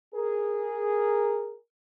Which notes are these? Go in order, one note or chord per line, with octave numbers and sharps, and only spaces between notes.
G#4 A#4